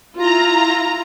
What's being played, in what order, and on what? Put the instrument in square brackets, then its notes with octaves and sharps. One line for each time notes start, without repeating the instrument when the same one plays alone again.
[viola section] E4 F4 [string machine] A#5